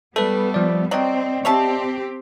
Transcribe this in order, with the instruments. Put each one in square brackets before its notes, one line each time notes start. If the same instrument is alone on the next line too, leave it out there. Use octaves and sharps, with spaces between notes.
[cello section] G3 B3 [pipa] A3 [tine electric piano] A4 B4
[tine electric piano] F3 D5
[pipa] F#3 [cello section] C4 [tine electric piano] D5 D#5 G5
[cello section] C4 G4 [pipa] C#5 E5 A5